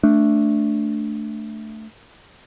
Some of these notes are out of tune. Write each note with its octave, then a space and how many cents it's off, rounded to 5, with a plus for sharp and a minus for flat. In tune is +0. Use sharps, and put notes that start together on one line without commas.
A3 +0 D4 -5